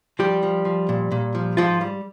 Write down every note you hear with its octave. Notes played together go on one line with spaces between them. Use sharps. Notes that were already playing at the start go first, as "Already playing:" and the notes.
F3 G3 G4
F3
F3
A#2
A#2
F3
G#2 F3 F4
G3